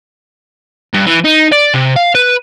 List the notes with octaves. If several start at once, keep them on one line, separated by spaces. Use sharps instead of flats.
G2
E3
D#4
D5
C3
F5
B4